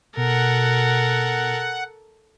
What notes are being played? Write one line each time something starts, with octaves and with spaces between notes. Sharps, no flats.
B2 A4 A#4 F#5